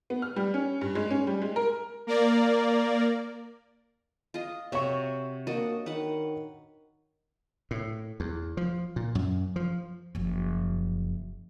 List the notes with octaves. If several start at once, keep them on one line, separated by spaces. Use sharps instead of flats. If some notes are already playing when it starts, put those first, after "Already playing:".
B3
F6
G3
C#4
G2
G#3
C#4
G3
G#3
A#4
A#3 A#4 D5
F4 D#5
C3 F#4 C#5 E5 C#6
A#3 D4 F#4 D#5
D#3 B4 F#5
A2
E2
F3
A#2
F#2
F3
F#1 F3